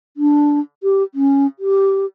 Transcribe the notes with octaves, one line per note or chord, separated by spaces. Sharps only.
D4
G4
C#4
G4